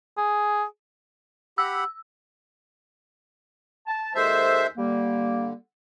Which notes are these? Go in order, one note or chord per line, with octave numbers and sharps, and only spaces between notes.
G#4
G4 F#5 B5 E6
A5
D#2 G#3 A4 C5 E5 E6
D3 G3 A#3